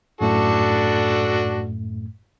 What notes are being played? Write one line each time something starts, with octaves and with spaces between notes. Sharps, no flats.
F#2 A2 A3 D4 F#4 A4